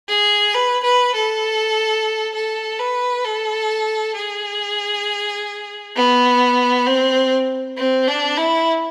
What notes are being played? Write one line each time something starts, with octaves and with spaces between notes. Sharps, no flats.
G#4
B4
B4
A4
A4
B4
A4
G#4
B3
C4
C4
D4
E4